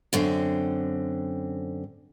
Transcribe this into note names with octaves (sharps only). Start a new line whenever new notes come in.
F#2 D3 C4